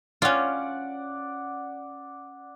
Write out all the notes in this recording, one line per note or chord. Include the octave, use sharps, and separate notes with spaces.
C#4 F4 D5 F#5